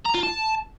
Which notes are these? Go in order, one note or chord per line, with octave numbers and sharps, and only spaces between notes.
A#5
F4
A5